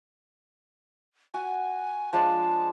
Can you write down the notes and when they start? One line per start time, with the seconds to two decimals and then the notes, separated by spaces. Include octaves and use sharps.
1.34 F#4 G#5
2.13 F3 G#3 D4 A5